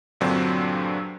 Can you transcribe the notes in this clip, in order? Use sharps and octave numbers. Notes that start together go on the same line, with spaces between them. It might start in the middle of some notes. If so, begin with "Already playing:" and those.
G2 A#2 D3 F#3 C4 D4